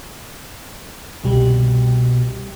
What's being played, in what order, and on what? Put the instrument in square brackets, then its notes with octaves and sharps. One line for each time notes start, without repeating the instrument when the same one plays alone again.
[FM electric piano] G1 C2 G3 [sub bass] B2